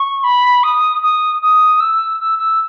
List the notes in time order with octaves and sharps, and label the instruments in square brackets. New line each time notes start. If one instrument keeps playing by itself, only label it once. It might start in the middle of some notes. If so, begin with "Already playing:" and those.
Already playing: [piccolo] C#6
B5
D#6
D#6
D#6
E6
E6
E6